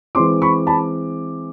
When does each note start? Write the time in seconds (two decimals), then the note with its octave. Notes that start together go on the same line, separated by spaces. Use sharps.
0.15 E3 G#3 C4 C6 D6
0.42 B5 C#6
0.67 A5 B5